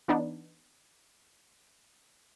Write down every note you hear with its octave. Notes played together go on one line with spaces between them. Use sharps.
E3 B3 D4 D#4